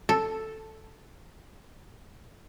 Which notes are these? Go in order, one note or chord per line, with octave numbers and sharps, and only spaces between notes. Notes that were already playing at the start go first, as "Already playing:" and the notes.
A4